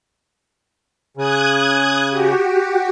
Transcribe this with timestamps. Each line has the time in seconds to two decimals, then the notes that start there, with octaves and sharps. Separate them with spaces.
1.17 C#3 D#6 F#6 G#6
2.10 F#4 G4